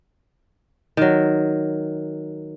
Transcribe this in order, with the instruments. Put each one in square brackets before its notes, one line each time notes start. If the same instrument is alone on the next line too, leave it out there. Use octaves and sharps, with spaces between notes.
[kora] D#3 F#3